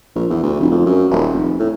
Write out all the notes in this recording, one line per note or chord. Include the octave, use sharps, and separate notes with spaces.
A#1
E2
D2
F1
F2
F#2
D#1
F1
A2